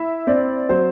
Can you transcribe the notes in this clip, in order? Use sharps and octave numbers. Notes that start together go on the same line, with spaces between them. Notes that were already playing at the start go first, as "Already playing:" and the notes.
Already playing: E4 E5
C4 D5
F#3 C5